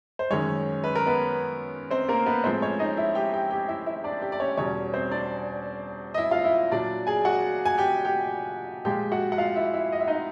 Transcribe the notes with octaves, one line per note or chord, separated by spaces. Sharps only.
C5
F#2 D#3 G#3 C#4 C#5
B4
A#4
B3 B4
C4 C5
A#3 A#4
B3 B4
A2 F3 G#3 C4 C5
C#4 C#5
D#4 D#5
E4 E5
G4 G5
G4 G5
G4 G5
E4 E5
E4 E5
D4 D5
G4 G5
D5
C#4 C#5
E2 B2 G3 C#4 C#5
C4 C5
D4 D5
D#5
E4 E5
F4 F5
E4 E5
A#2 F#3 D4 D5
G#4 G#5
F#4 F#5
G#5
G4 G5
G4 G5
A#2 F3 G#3 G4 G5
F#4 F#5
F#5
F4 F5
E4 E5
E4 E5
D#5
E5
D#4 D#5